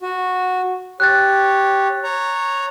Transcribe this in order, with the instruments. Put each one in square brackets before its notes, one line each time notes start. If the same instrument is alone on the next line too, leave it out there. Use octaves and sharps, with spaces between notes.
[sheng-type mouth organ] F#4
[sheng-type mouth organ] G4 C#5 [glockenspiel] F#6 A6
[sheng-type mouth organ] C#5 A#5